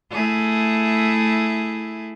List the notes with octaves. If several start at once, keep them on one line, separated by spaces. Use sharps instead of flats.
A3 E4 G#4